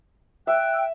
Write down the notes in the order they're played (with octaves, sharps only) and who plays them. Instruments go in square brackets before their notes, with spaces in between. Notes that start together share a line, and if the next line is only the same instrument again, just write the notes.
[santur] E5 [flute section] G5 E6 F#6